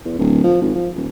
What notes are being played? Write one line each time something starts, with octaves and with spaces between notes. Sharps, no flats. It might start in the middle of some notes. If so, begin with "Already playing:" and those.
E2
D1
F3
G#1
F3
D#1